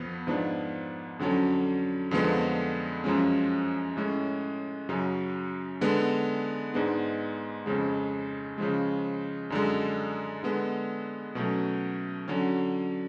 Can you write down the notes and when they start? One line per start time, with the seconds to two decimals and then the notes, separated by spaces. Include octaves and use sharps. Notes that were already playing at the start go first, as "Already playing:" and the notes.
Already playing: F2 F3 B3
0.27 G#2 F3 B3 D4
1.19 F2 D3 F#3 C#4
2.11 F2 D3 F3 G#3 B3
3.04 F#2 F3 G#3 C#4
3.97 A2 G#3 C#4
4.89 F#2 C#3 F#3 C#4
5.81 D3 G#3 B3
6.74 G#2 G#3 B3 D4
7.66 F2 C#3 G#3
8.58 C#3 F3 G#3
9.50 F#2 D3 G#3
10.43 D3 G#3 B3
11.35 B2 F#3 A3 C#4
12.28 D3 F#3 C#4